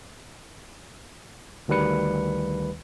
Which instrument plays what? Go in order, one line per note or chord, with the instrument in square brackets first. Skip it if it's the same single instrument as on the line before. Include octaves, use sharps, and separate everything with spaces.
[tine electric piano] D2 D#3 G3 B4 C#7